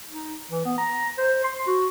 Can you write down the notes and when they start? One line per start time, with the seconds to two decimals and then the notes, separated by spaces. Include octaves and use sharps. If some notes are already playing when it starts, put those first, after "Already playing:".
0.11 D#4
0.51 E3
0.65 B3
0.78 A#5
1.18 C5
1.44 C6
1.67 F#4